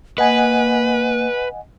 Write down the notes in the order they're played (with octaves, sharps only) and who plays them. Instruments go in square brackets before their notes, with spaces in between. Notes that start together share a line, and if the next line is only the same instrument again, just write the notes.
[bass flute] A#3 [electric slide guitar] B4 [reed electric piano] D#5 F#5 G#5